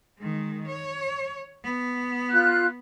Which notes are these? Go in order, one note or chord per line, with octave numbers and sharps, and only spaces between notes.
D#3 G#3
C#5
B3
F4 F#6